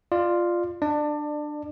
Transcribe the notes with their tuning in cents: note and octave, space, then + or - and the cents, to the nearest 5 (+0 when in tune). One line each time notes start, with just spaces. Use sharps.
F4 +0 D5 +25
D4 +20 D5 +30